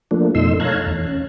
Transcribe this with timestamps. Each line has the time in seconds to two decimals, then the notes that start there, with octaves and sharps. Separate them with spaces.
0.11 F3 A3 A#3 D4
0.35 F2 B2 A3 D#4 C6 E6
0.60 C#5 F5 A5 A#5 F#6 G#6
0.87 E2
1.07 C#4